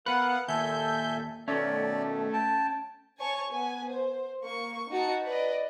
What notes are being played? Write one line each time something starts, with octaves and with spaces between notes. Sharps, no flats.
B3 A#4 B4 F5 F#5
D#2 A#2 A4 E5 G#5 G6
B2 D#3 A3 C#4 D5
G5 A5
C#5 G#5 A5 C#6
B3 G#5
C5
A#3 C#6
D#4 F#4 A5 C#7
B4 D5 D#5